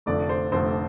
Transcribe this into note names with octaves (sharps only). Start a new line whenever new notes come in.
F1 F2 D3 A3 D5
C5
F1 F2 D3 A3 C5